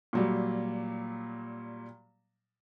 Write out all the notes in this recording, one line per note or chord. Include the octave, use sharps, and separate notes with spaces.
A#2 F#3 G3